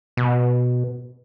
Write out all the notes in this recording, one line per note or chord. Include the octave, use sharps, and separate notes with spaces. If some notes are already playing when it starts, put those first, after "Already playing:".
B2